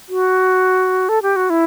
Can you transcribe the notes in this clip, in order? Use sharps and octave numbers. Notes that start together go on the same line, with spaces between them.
F#4
A4
G4
F#4
E4